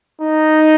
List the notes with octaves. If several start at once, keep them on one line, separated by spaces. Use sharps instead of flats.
D#4